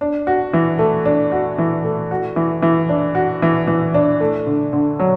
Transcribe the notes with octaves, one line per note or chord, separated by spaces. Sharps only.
D4
F#4
E3
A3
D4
F#4
E3
A3
F#4
E3
E3
D4
F#4
E3
E3
D4
A3
D3
D3
F#3